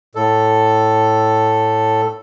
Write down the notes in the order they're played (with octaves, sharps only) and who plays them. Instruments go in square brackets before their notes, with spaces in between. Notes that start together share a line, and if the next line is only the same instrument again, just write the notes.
[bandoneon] A2 A4